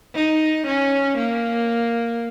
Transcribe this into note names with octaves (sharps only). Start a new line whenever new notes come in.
D#4
C#4
A#3